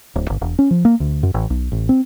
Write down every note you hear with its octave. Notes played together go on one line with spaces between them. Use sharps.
D1
G1
E1
C#4
F3
A#3
D2
F#2
A1
B1
A1
C4